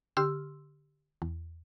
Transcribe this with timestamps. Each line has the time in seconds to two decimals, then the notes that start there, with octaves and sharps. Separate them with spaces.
0.17 D3 G4 C6 E6 F6
1.22 E2